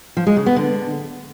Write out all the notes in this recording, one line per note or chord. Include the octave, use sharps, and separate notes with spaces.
F3
G#3
C#3
B3
D3